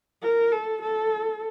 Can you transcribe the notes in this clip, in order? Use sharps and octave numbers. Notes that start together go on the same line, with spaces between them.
A#4
A4
A4